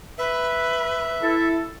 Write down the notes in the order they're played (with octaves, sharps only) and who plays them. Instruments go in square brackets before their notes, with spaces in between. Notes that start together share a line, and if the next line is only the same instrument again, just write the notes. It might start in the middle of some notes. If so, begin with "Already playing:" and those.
[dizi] B4 [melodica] E5
[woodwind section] E4 A4